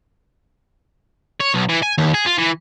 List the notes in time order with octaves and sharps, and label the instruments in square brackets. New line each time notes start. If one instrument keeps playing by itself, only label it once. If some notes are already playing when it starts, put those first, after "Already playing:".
[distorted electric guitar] C#5
B1
E3
G#5
D#2
G#4
F4
E3